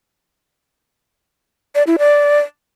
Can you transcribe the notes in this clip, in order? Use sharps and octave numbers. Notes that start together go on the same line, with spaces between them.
D5
E4
D5